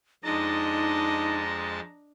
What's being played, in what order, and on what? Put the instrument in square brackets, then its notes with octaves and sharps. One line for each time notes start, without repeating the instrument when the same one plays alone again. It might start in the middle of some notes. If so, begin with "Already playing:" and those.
[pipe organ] F2 G#3 A5 [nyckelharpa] D4 D#5 [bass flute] D#4 [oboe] A#5